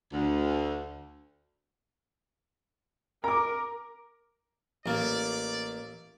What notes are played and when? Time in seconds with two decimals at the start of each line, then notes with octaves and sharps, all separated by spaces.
0.13 D2
3.24 A#4 A#5 D6
4.86 A1 A#3 D5